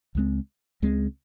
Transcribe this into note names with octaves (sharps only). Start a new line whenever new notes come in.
C#2 C#3 G#3 C4
C#2 C#3 G#3 C4